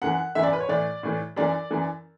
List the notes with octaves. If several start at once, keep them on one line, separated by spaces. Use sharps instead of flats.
F#2 E3 F#5
F#2 E3 E5
D5
B4
C#5
A2 E3 D5
A2 E3
F#2 E3 D5
F#2 E3